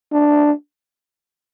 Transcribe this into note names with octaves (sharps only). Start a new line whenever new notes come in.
D4